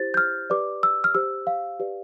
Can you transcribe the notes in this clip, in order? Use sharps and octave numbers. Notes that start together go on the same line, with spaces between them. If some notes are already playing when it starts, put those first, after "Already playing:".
Already playing: E4 G4 C5 A6
G6
F6
G4 B4 D5 D6
E6
F6
G4 C5 E6
F5
G4 B4 D5